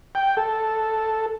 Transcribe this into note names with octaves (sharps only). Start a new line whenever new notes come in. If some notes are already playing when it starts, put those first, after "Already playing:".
G5
A4